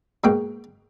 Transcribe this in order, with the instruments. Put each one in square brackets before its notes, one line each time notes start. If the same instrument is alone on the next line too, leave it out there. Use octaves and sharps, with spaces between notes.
[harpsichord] G#2 B2 A#3 G5